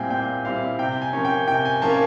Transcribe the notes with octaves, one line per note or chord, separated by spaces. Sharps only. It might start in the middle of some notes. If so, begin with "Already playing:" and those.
Already playing: A#2 G3 C4 E4 G5 G#5
A#2 G5
G3 C4 E4 F5
C3 G5
G#5
F3 A#3 C#4
G5
C3 G5
G#5
F3 A#3 C#4 A5